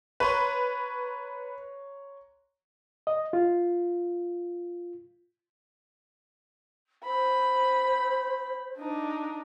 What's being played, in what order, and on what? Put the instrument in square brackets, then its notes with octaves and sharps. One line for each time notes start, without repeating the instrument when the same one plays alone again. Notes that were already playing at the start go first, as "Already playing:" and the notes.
[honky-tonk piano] B4 [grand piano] C#5 A#5 C6
[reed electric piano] D#5
F4
[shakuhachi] C5 [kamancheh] B5
[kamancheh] D4 D#4